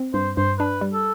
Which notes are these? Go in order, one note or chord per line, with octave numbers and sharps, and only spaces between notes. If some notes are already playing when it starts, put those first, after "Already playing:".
Already playing: C4
G2 C5
G2 C5
D4 B4
G3
A4